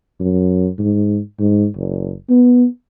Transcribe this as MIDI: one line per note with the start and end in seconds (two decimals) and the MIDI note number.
0.20 0.68 42
0.79 1.19 44
1.39 1.66 44
1.76 2.12 30
2.30 2.65 59